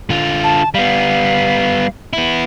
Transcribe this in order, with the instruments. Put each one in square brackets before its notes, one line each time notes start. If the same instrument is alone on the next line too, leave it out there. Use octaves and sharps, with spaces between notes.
[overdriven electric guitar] D3 F4
[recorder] A5
[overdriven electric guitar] G3 B3 [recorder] F5
[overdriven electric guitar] B3 E4